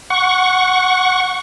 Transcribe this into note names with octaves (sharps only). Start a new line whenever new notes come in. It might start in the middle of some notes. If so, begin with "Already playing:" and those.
F#5 C#6